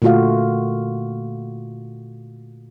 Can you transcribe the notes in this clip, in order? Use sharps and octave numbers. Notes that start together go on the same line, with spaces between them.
A#2 D3 A3 F4 F#4 F5